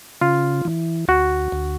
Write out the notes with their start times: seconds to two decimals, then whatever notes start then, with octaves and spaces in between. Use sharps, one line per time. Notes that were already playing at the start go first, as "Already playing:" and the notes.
0.21 C#3 F4
0.65 E3
1.08 D2 F#4
1.52 D2